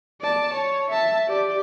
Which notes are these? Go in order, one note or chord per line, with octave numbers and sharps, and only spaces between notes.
D5 A5
C#5
E5 A5
G4 D5